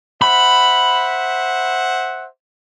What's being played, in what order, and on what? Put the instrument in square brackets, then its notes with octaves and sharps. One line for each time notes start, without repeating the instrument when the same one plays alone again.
[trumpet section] C5 E5 F#5 [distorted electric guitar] B5